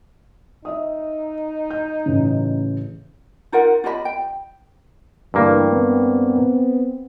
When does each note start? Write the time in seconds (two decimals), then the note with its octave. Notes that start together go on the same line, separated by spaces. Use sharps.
0.65 D#4 D#5 E5 D#6
1.70 G6
2.06 A1 C#3
3.52 D#4 F4 A#4 F#5
3.84 F4 G4 D#5 B5
4.05 G5
5.34 D2 G2 D3 E3 A#3
5.71 B3 C4